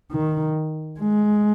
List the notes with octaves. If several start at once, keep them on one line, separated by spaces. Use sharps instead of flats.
D#3
G#3